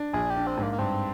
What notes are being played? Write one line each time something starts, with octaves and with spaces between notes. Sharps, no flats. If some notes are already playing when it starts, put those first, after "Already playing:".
Already playing: D4
A#1 G#4
G4
D4
C4
G#2 A#3
A#3
G2 C4